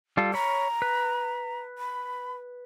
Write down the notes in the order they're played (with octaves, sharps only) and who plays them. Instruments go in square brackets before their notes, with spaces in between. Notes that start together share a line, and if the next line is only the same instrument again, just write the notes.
[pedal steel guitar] G3 F4 A4
[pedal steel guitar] C#5 B5 [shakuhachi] A#5
[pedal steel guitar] B4
[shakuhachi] B5